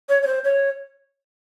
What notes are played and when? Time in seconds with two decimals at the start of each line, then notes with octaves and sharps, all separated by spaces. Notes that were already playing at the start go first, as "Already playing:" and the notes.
0.09 C#5
0.23 C#5
0.27 C5
0.44 C#5